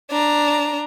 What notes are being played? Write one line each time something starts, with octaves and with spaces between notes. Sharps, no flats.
D4 A#5